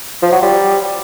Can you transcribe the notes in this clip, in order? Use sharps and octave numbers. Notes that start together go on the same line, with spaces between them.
F3
F#3
G3